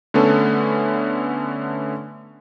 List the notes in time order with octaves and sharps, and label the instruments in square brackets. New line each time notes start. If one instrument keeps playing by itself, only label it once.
[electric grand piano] D3 A3 B3 C#4 A4